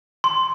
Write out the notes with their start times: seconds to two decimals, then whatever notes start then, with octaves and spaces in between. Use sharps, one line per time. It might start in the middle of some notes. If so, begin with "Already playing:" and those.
0.24 C6